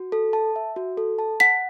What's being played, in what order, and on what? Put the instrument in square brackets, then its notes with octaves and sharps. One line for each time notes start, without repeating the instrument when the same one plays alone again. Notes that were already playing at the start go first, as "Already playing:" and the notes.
Already playing: [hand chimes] F#4
A4
A5
E5
F#4
A4
A5
[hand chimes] F#5 [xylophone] B6